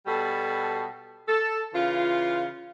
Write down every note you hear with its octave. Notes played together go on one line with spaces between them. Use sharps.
B2 G3 F#4 A4
A4
C#3 E3 F4